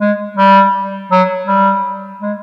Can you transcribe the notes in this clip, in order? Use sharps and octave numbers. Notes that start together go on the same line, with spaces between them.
G#3
G3
F#3
G3
G#3